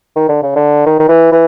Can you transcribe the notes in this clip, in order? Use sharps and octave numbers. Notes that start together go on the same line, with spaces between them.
D#3
D3
C#3
D3
D#3
D#3
E3
E3